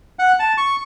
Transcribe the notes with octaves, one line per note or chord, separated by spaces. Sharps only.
F#5
A5
C#6